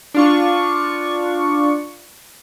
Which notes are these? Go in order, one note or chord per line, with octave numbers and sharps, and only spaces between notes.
D4 F4 C#6